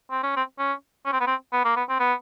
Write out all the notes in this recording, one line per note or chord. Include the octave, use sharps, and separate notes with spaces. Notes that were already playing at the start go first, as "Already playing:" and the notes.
C4
C#4
C4
C#4
C#4
C4
B3
C4
B3
A#3
B3
C4
B3